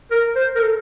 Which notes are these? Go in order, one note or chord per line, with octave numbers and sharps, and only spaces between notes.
A#4
C5
A#4
A4